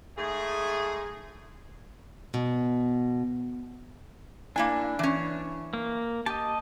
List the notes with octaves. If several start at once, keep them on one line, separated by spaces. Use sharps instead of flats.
G#2 A3 G#4
B2
A#3 D4 E4 G#5
E3 C#4
A#3
G4 D#5 A5